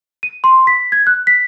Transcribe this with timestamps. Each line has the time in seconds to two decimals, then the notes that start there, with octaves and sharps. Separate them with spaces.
0.23 D#7
0.44 C6
0.67 B6
0.92 G#6
1.07 F#6
1.27 B6